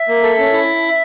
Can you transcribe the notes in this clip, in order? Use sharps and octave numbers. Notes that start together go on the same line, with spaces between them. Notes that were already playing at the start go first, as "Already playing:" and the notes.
Already playing: E5
A#3
A4
C#4
E4